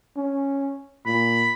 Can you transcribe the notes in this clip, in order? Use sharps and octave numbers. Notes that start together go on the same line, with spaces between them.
C#4
A#2 B5